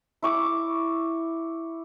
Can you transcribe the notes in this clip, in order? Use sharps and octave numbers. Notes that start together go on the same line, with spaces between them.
E4 C#6 D6